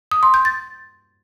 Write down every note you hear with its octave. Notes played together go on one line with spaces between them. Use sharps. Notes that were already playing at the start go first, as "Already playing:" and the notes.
D#6
C6
G6
A6